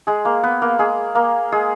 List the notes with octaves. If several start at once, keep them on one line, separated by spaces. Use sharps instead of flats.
G#3 G#4
A#3 A#4
B3 B4
A#3 A#4
G#3 G#4
A#3 A#4
G#3 G#4